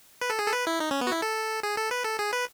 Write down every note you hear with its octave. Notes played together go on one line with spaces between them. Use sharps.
B4
A4
G#4
A4
B4
E4
D#4
C#4
B3
F#4
E4
A4
G#4
A4
B4
A4
G#4
B4